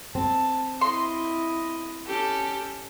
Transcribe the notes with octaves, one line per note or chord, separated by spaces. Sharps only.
C4 A5
E4 D#5 C6
C#4 G4 A4